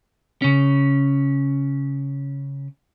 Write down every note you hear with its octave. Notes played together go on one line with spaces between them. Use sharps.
C#3 C#4